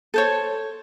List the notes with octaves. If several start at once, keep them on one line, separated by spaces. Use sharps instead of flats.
A4 C5 C#5